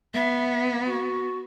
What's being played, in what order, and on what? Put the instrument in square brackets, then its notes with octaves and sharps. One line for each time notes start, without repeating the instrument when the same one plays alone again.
[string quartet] B3 [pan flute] E5
[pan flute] F#4